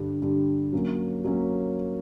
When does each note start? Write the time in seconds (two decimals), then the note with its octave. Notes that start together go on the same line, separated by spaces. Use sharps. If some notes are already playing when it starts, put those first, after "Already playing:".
Already playing: G2 D3 G3
0.22 G2 D3 G3
0.73 F#3 A#3 C#4
1.24 F#3 A#3 C#4